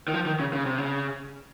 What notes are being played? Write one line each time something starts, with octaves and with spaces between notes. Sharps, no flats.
D#3
F3
D#3
C#3
C#3
C3
C#3